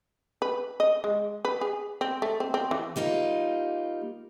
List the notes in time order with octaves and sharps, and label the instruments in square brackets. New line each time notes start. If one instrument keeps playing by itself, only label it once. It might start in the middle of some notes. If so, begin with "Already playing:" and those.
[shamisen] B4
D#5
G#3
B4
G#4
C4
A3
C4
C4
E3
[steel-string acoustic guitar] G3 A#3 D#4 F4